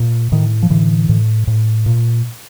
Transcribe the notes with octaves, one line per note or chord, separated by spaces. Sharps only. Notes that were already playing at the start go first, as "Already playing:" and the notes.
Already playing: A#2
A2 D#3
F3
A2 D3 E3
A2
A2
A#2